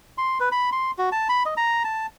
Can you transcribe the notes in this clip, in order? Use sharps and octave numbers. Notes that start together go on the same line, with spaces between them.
C6
B4
B5
C6
F#4
A5
B5
D#5
A#5
A5